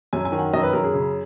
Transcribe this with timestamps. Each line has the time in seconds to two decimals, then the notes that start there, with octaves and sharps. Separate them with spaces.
0.13 F#2 G#5
0.25 G#5
0.32 D#3
0.39 F#5
0.53 F#2 D#5
0.63 B4
0.73 F#2 A#4
0.84 G#4
0.94 C#3